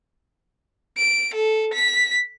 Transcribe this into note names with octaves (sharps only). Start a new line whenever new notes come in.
D7
A4
B6